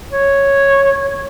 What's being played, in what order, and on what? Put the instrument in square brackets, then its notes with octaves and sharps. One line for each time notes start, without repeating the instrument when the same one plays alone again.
[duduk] C#5